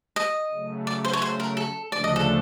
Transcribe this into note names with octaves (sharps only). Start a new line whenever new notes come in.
D#5
C#3 F#3 A3
D5
C5
C#5
C5
A#4
A4
D2 C#3 F3 A3 D4 D5
D#5
A4